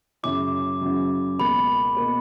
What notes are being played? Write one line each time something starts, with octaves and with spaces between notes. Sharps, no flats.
F#2 C#3 F#3 C#4 E4 D6
F#2 C#3 F#3 C#4 E4
C#2 B2 A#3 B5
B2 A#3